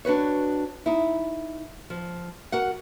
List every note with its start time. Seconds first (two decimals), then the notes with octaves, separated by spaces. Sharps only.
0.05 D4 F#4 B4 C#5
0.86 D#4 E4
1.90 F3
2.52 F#4 A#4 F#5